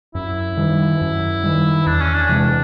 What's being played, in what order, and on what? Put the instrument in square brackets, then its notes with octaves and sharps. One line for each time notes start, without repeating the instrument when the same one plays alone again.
[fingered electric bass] F#2 [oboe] E4
[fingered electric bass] D#3 G3
F#2
D#3 G3
[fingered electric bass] E2 [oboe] D4
[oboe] C#4
D4
[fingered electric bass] C3 E3 G#3